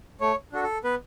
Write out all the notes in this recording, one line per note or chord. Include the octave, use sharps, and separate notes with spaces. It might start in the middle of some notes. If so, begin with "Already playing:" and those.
A3 C#5
D4 F#4 A4
A4
B3 B4